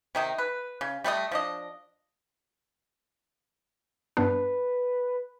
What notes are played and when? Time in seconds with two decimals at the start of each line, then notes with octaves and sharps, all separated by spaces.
0.15 C3 D#3 D#4
0.38 B4
0.81 C#3
1.04 G3 A3 B4 D#5
1.31 F3 D4 D#5
4.17 G2 B3 D4 B4